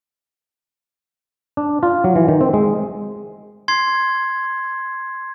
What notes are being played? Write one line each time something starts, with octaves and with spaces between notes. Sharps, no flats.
D4
F4
F#3
E3
D#3
C4
G#3
C6 G#6 C7